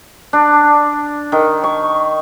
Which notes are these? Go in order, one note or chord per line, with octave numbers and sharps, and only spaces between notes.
D4
D#3
C#6